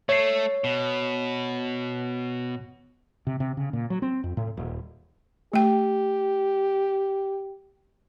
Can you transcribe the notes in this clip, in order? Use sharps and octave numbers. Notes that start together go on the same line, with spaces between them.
A3 C#5 C7
B2
C3
C3
C#3
A#2
F#3
C4
F2
A2
D#1
A3 G4 G5